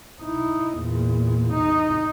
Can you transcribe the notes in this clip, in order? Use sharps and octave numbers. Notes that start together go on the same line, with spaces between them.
D#4 E4
E2 A#2
D#4